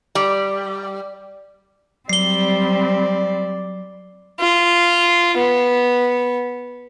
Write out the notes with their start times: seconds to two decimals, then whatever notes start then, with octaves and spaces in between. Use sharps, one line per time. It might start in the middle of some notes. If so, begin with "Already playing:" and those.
0.15 G3
2.09 F#3 G3 C4 D5 C7 G7
4.40 F4
5.37 B3